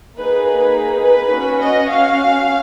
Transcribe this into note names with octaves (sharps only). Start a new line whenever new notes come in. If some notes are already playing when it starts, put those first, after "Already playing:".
A#3 D#4 G#4 B4
B4
B4
C#4 F#4
D#5
F5